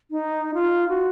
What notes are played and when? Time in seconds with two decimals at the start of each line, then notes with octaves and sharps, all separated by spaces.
0.11 D#4
0.54 F4
0.89 F#4